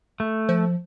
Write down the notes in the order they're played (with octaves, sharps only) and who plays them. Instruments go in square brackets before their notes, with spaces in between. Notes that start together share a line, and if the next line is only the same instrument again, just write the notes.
[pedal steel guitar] A3
[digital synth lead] F3